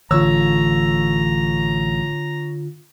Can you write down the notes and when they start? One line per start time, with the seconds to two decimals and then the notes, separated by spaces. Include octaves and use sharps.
0.11 A1 D3 F4 C#5 A#5 E6